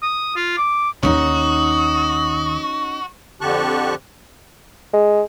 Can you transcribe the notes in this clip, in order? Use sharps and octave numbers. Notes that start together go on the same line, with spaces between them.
D#6
F4
D6
D#2 D#3 C#4 D#4 F#4 D#6
F2 D3 G4 A5 C#6 F#6
G#3